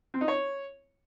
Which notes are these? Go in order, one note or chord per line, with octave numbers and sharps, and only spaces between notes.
C4
D#4
C#5